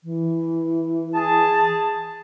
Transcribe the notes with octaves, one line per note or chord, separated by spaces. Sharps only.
E3
G#4 A5